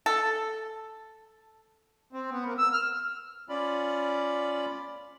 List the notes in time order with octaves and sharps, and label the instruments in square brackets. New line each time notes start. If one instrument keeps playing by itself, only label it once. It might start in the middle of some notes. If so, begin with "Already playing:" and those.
[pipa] A4
[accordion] C4
B3
A#3
E6
F6
C#4 F4 D5 B5